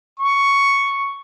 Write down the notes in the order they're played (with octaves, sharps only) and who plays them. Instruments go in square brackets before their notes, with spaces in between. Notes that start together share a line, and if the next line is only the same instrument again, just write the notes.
[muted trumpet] C#6